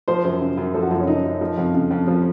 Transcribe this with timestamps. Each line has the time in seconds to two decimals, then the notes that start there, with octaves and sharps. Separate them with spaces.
0.08 F3 C5
0.24 F#2
0.41 C#3
0.57 F#2
0.74 F3 A4
0.82 F#4
0.91 F#2 F4
1.00 C#4
1.07 C#3 D#4
1.24 F#2
1.41 F3
1.57 F2
1.74 C#3
1.91 F2
2.08 F3